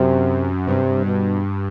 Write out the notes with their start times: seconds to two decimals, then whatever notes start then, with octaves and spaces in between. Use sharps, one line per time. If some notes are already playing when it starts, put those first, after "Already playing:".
Already playing: F#2 C3
0.67 G2 C3
1.05 G2 B2